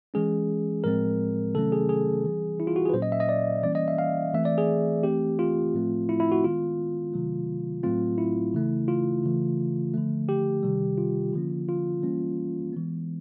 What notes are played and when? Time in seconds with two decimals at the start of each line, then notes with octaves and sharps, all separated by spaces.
0.14 E3 G#3 C#4 G#4
0.84 A2 F3 G#3 C4 A#4
1.55 C3 D#3 F#3 A3 C#4 A4
1.72 G#4
1.89 G#4
2.25 E3 G3 C4
2.60 E4
2.67 F4
2.76 F#4
2.85 G#4
2.89 B4
2.94 A#2 F#3 A#3 C#4 C5
3.02 D#5
3.12 E5
3.20 D#5
3.29 D5
3.63 E3 G3 A#3 C#4 D5
3.75 D#5
3.88 E5
3.98 F5
4.34 E3 A3 C4 E5
4.45 D5
4.58 G#4
5.03 E3 A3 C4 G4
5.39 F4
5.74 A2 F3 A3 C4
6.09 E4
6.20 E4
6.32 F#4
6.44 D#3 G#3 B3 F4
7.13 C3 D#3 F#3 A3
7.83 A2 F#3 A3 C4 F4
8.18 E4
8.54 C#3 E3 A3
8.88 F4
9.23 C#3 E3 A3
9.94 D3 F3 A3
10.29 G4
10.63 C3 D#3 G3
10.98 F4
11.33 D3 F3 A#3 C#4
11.69 F4
12.03 E3 G3 A#3 C#4
12.73 E3 G#3 B3